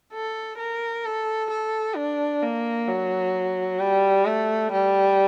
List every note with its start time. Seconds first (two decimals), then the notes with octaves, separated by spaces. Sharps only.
0.13 A4
0.58 A#4
1.05 A4
1.50 A4
1.96 D4
2.42 A#3
2.88 F#3
3.80 G3
4.25 A3
4.72 G3